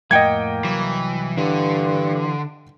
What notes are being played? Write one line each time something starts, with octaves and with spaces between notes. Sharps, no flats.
F2 A2 A#3 D#5 F#5 G5 G#6
C2 E3 F#3
G2 D3 E3